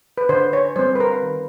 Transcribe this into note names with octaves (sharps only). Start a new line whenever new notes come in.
B4
D3 C5
C#5
G3 C4 C5
B4
A#4
D#3